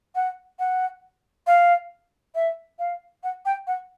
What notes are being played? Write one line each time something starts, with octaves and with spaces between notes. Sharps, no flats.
F#5
F#5
F5
E5
F5
F#5
G5
F#5